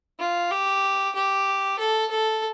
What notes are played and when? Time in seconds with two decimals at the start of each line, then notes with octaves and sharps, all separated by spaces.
0.19 F4
0.51 G4
1.15 G4
1.79 A4
2.11 A4